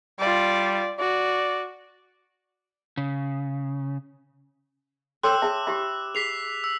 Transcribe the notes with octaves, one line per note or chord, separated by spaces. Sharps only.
G3 F4 D5
F#4 D5
C#3
A4 C5 C#5 G5 C6 D6 E6 F#6
G#4 E5 A5
G4 E5 B5
G#4 B6 C7 F7
E6